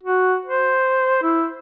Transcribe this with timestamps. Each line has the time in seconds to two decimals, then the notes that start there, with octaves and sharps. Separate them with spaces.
0.03 F#4
0.46 C5
1.22 E4